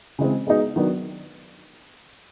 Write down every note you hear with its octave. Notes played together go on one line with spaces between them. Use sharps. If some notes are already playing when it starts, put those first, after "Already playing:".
C#3 E3 G#3 C4
G#3 B3 D#4 G#4
D#3 F#3 B3 D4